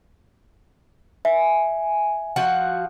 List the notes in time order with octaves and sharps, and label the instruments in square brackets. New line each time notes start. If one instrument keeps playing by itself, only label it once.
[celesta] E5 [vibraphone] G#5
[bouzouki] F3 F#4 F#5